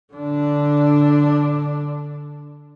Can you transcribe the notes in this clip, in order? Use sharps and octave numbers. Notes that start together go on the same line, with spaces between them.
D3 D4